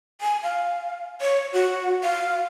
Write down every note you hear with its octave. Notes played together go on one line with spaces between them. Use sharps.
G#5
F5
C#5
F#4
F5